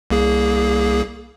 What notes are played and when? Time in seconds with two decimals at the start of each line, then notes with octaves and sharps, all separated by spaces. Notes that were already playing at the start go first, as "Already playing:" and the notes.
0.10 C2 A#3 G#4